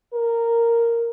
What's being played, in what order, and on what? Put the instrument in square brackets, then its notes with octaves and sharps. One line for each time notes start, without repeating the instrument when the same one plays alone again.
[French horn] A#4